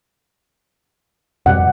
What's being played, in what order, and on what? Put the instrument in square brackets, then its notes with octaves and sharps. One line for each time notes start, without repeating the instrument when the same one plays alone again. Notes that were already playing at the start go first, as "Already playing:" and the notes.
[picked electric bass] F2 B2 G3 [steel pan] F#5